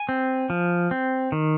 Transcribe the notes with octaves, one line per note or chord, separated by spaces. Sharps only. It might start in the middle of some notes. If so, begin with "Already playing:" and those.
Already playing: G#5
C4
F3
C4
D#3